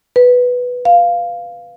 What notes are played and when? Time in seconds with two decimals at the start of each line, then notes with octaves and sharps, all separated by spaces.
0.16 B4
0.85 F5